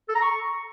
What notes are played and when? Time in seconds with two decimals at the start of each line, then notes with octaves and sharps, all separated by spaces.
0.08 A4
0.15 A#5
0.22 C#6